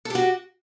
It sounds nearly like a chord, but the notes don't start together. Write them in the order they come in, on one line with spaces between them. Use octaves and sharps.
A4 G4 F#4